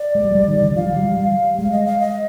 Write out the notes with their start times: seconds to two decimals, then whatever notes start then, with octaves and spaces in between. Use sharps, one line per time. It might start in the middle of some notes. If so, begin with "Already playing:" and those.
Already playing: D5
0.15 G#3
0.24 G3
0.35 G3
0.48 D#3
0.62 D3
0.76 F3 F5
0.86 G3
0.96 G3
1.17 G3
1.58 G#3 F5
1.72 D#5
1.86 F5
2.00 D#5